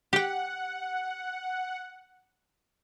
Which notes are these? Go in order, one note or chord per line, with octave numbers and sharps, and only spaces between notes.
G4 F#5 G5